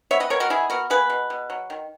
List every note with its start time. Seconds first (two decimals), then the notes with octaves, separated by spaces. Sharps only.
0.11 B3 C#5 E5
0.20 B4 D#5
0.30 B2 A#4 C#5
0.40 F#4 A#4
0.50 B3 E4 G#4
0.70 B3 F#4 A#4
0.90 A#3 G#4 B4
1.10 B2
1.30 B2
1.50 F#3
1.70 D#3